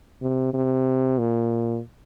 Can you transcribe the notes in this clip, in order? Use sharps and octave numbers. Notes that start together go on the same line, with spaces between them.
C3
C3
A#2